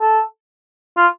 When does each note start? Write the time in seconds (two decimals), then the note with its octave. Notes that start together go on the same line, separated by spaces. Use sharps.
0.01 A4
0.97 F4